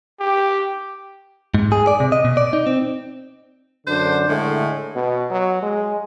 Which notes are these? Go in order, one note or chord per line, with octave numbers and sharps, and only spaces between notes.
G4
G#2
G#4
D5
C3
D#5
B2
D5
D#4
C4
F#2 D3 D4 C5
A2 D3 G#3 A3
B2
F#3
G#3